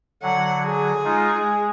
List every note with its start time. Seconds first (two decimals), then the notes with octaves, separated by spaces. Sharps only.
0.22 D3 F#3 F#5
0.67 G#4
1.05 G#3 D#4 F4
1.40 G#3